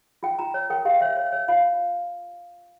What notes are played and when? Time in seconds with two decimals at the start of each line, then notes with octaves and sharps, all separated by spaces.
0.23 F4 G5
0.39 F4 A#5
0.54 C#5
0.70 A#4 G5
0.85 G4 F5
1.01 C#5 E5
1.17 C#5
1.32 C#5
1.48 F4 F5